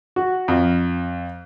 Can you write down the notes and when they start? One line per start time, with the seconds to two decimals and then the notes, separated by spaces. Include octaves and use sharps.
0.16 F#4
0.48 F2